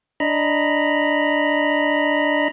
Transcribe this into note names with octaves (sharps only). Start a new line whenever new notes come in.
D4 D#5 A#5 B5